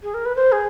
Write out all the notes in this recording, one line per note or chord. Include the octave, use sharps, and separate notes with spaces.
G#4
A#4
B4
C5
G#4